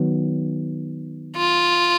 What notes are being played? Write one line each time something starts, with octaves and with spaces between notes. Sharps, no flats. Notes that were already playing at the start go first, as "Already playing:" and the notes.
Already playing: D#3 F#3 B3
F4